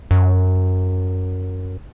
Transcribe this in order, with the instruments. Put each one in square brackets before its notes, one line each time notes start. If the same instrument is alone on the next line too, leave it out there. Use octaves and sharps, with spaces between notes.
[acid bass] F#2